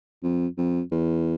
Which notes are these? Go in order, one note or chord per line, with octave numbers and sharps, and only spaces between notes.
F2
F2
E2